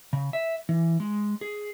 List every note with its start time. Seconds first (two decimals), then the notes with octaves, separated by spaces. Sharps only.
0.13 C#3
0.33 E5
0.69 E3
1.00 G#3
1.41 G#4